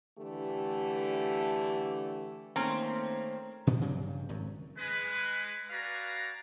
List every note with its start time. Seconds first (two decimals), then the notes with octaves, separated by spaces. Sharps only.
0.19 D3 E3 A3 G4
2.56 D#3 A3 A#3 C4 C#4 A#5
3.67 A#2 C#3 F3 B3
3.80 G2 C#3 F#3 G3
4.29 G#1 F#2
4.77 G#3 B4
5.70 F#4 B4 D5 F5 G#5 A#5